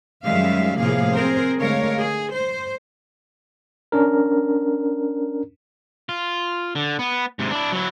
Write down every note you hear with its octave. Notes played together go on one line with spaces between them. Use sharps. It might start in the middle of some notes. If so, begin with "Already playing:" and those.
F#2 D#3 G3 G#3 E5 F5
A2 C3 F3 A#3 G#4 F5
C4 G#4 A#4 C5
D3 G#3 A3 A#4 C#5 F5
G#4
C5
C#4 D4 A#4
F4
D3
B3
G#2 C3
D4 E4
F#3 E4